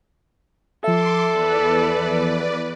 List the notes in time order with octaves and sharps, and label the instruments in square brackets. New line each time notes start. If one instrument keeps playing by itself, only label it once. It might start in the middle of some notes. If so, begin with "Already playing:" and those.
[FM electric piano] F3 E5 [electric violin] A4 [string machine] C6 D6
[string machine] E2 B4 D5